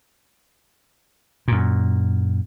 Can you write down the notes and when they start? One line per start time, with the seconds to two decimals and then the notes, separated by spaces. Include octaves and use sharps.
1.48 F#2 A#2